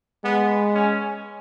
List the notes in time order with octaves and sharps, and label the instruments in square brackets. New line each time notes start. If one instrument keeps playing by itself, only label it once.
[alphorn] G#3 [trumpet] B3
[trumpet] C#4